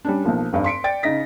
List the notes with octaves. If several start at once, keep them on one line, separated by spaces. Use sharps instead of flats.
G3 C#4 D4
B1 B2 F3 A#3
F1 G2 D5 F5
C6 B6 C#7 D7
D5 G5 A6 D7
C#3 D#4 D#5 A#6 B6